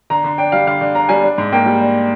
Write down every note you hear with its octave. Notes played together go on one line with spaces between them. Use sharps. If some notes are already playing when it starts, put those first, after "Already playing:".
D3 A#5
D3
D4 G5
G3 F5
D3 F5
D3
D4 A#5
G3 G#5
D4
G#2
A#3 G5
G3
D4